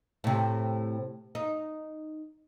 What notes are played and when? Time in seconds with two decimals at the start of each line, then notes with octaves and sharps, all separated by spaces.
0.24 A2 C3
1.35 D#4